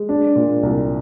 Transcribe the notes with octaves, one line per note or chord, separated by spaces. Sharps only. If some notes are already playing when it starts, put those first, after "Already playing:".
Already playing: G#3
D4
A#2
C2